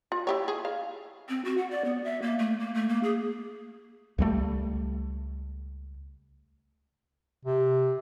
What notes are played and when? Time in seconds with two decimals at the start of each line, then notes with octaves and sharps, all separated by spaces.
0.12 F4
0.27 E4 G4 C#5
0.48 G#4
0.65 F5
1.28 C4
1.45 F#4
1.58 F#5
1.71 D5
1.85 B3
2.04 E5
2.22 A#3
2.39 A3
2.60 A#3
2.74 A3
2.89 A#3
3.03 G#4
4.18 C#2 G3 A3
7.45 C3